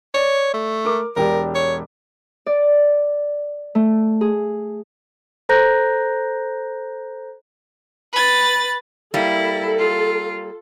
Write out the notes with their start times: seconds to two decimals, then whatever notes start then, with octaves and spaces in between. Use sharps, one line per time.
0.14 C#5 D5
0.54 A3
0.85 A#4 D6
1.16 E1 G4 A#4 D5
1.55 C#5
2.46 D5
3.75 A3
4.21 G#4
5.49 A4 C5 A#5 F#6 G6 A#6
8.13 B4 A6
9.14 G3 A#3 E4 A4
9.78 F4